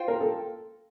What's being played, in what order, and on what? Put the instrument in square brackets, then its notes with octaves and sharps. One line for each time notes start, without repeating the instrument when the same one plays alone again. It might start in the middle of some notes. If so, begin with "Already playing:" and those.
Already playing: [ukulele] F4 C5 G5
[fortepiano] A#4
A4